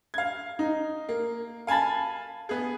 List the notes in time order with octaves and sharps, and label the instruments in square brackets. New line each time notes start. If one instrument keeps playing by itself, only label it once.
[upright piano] F5 G#6
D#4
A#3
F5 G#5 A5 B5 A6
B3 G#4